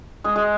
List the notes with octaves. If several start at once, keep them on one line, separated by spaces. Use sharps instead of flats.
G#3 G#4
G#3 G#4